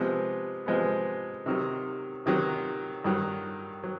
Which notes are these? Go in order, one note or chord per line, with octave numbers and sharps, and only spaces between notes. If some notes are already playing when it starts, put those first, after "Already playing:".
Already playing: C3 F3 G#3 B3
C3 F3 G#3 B3
C3 D#3 F#3
C3 D#3 F#3
G2 D#3 F#3
F#3